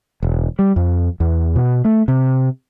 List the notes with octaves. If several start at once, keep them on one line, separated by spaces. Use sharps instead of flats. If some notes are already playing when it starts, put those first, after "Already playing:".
E1
G3
F2
E2
B2
A3
C3